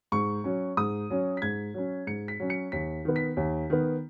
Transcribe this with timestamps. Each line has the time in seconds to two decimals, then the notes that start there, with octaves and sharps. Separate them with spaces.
0.12 G#2 C#6
0.44 F#3 C#4
0.77 G#2 D#6
1.10 F#3 C#4
1.37 B6
1.42 G#2 G#6
1.74 F#3 C#4
2.07 G#2 C#7
2.28 B6
2.40 F#3 C#4
2.50 C#7
2.72 D#2 B6
3.05 D#3 B3
3.16 B6
3.37 D#2
3.70 D#3 B3